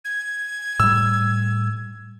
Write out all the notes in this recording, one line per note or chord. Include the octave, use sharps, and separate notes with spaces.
G#6
A2 G3 E6